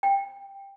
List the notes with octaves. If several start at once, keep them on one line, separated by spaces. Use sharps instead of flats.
G5